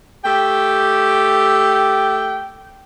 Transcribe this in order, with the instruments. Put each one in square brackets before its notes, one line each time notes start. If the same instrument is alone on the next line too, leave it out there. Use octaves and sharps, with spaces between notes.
[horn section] A3 G4 [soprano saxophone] G5